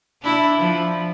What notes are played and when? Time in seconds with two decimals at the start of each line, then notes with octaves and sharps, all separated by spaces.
0.23 D4 E4
0.58 F3